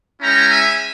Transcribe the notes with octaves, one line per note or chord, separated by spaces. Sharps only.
G#3 C#4 E4 G5 A#5
E5 G#5